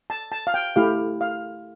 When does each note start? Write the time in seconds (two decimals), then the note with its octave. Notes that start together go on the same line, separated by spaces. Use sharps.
0.10 A5
0.32 A5
0.47 F5
0.54 G5
0.76 A3 E4 G4 F5
1.21 F5